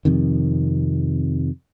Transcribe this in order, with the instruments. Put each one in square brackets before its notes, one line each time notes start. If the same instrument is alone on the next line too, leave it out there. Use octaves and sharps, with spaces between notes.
[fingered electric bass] F2 C3 D#3